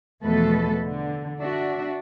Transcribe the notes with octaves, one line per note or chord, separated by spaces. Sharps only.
E2 B2 F3 A3 A4 B4
D3
D4 F#4 E5